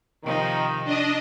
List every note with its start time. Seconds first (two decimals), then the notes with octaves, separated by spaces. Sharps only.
0.23 C3 D#3 F3 D#4
0.84 D4 D#5